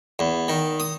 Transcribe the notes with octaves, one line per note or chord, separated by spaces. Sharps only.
E2
D#3
D#6